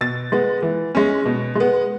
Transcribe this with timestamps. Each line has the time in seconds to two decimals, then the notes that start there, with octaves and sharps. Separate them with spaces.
0.01 B2 A6
0.32 G#3 B3
0.62 E3
0.95 G#3 C#4
1.25 B2
1.55 G#3 B3